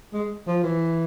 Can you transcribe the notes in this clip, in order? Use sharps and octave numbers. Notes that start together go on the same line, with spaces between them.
G#3
F3
E3